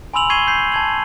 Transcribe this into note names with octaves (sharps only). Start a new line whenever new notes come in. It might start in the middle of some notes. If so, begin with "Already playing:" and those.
G#5 B5 C6 E6 F7 F#7
C#6 G#6 C7 D#7 G7
G6 C7
A5 G#6 F#7